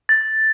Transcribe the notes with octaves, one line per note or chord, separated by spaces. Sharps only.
A6